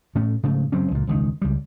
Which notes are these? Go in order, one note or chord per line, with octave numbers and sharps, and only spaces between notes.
A2 A3 C#4
G#2 C#3 A3
F#1 F#3 C4 C#4
C#2 A#2
E1 C#2 D#3
C#2 G3